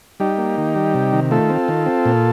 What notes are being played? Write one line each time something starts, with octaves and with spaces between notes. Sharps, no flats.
G3 D#4 G4
A#3
D#3
G3
C3
D#3
A3 F4 A4
C4
D#3
C4
A#2